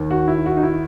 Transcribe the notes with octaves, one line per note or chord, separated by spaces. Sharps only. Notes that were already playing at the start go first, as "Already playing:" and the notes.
Already playing: D#2 D#3
F#4
E4
F#4
D#4
E4